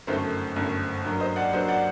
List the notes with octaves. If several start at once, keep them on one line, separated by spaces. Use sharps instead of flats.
G1 F#2 D#3 A3 A4 C5
G1 F#2 D#3 A3
G2 F#3 A#3
C5 D#5
D5 F#5
G2 F#3 A#3 C5 D#5
D5 F#5